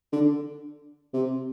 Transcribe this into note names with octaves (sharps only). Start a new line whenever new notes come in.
D3
C3